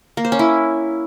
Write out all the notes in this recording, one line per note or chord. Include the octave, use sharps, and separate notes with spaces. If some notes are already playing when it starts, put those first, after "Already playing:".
A#3
C5
C#4
E4